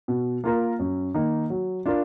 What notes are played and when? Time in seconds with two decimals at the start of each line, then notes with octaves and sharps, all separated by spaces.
0.08 B2
0.44 A#3 F4 A#4
0.79 F#2
1.14 D#3 A#3 D#4
1.50 F#3
1.86 D4 F4 A#4